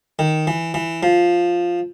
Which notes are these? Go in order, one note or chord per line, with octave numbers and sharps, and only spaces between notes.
D#3
E3
E3
F3